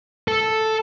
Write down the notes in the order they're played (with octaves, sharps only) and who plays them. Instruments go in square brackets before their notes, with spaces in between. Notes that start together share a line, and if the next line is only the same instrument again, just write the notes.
[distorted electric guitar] A4